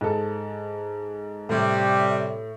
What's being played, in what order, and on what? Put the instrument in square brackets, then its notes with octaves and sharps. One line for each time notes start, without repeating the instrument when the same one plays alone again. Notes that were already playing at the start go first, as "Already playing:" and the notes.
[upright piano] G#2 A4
[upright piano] A2 [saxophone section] C3 G3